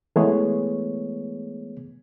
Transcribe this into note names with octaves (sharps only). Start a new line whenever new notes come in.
E3 G#3 A3 B3 G#4 C#5